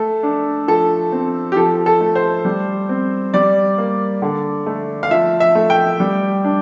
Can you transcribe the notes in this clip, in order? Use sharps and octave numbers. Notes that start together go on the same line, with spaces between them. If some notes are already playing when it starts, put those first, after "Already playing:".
Already playing: A3 A4
D4
F3 A4
C4
G4
F3 A4
A4
A3
C5
G3
C4
G3 D5
A#3
D3
A3
F5
F3 E5
E5
A3
G5
G3
D4